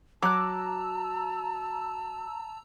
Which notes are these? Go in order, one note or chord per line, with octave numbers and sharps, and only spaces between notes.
F#3 A5 A#5 D6 E6 F#6